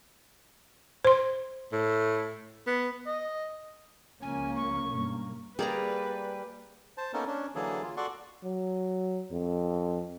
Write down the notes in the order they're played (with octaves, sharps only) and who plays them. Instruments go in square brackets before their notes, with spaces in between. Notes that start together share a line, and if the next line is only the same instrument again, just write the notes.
[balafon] C5 C6
[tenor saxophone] A2
B3
[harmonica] D#5
[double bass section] C#2 F3 A#3 [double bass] C#4 [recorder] G#5
[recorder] C#6
[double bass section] B1 G2 A#3
[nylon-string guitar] G3 A#3 [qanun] G#4 D5 A#5 [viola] B4
[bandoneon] C5 A5
A#3 B3 C#4 D#4 A4 A#4
C#4 D4
D3 E3 F#3 A#3 G#4 A4
F4
F#4 A4 D5 F#5 C6 C#6
[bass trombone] F#3
F2